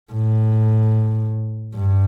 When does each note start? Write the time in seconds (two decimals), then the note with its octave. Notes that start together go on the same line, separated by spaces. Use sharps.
0.12 A2
1.75 G2